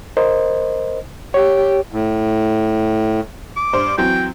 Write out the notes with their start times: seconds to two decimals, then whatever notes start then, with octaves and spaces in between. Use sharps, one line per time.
0.17 A#4 C5 D#5
1.34 G4 C#5
1.92 A2
3.56 D6
3.73 G2 C5
3.98 E3 F#3 C4 G5